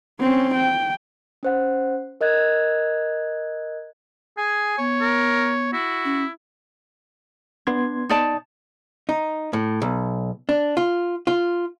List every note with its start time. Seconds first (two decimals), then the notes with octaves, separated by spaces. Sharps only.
0.20 C4 C#4
0.55 G5
1.43 C#4 C5 F#5
2.21 A#4 D#5 F#6 G#6
4.38 G#4 G#5
4.78 B3 C#5
5.01 A#4
5.73 E4 F#4
6.05 C#4
7.67 B3 D4 C6 G#6
8.09 D#4 D5 A5
9.09 D#4
9.53 A2
9.82 B1
10.49 D4
10.77 F4
11.27 F4